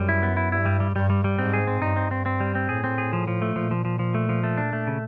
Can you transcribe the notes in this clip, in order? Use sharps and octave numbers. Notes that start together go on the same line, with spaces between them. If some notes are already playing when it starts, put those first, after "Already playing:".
Already playing: F#2 G3
E4
B3
E4
G2 E4
G3
G3
G2 G3
G3
G3
G#2 C4
G#4
C4
G2 D#4
C4
C4
C4
G3
C4
A2 G#4
C4
G#4
F3
F3
A3
A#2 F3
F3
F3
F3
A3
F3
A3
D4
A3
C#3